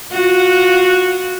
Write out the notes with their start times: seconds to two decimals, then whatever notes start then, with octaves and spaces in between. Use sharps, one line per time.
0.11 F4 F#4